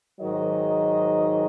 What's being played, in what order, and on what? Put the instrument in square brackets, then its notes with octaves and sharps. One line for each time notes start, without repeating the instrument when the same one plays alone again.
[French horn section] G#2 D#3 F#3 D#5